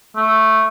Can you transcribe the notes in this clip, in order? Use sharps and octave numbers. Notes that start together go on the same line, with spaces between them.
A3